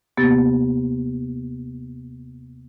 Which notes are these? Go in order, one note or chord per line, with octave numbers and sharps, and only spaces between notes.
D#2 C3 A#3 B3 G4 A6